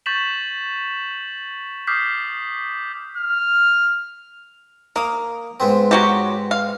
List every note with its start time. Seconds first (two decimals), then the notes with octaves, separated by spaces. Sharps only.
0.06 C#6 G6 A6 B6 E7 F#7
1.87 D6 D#6 F6 G6 B6 C7
3.17 F6
4.96 A#3 F5 D#6
5.60 G#2 B3 C4
5.91 F#3 F#4 G4
6.51 F5